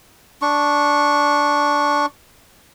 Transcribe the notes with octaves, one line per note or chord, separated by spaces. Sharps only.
D4 C#6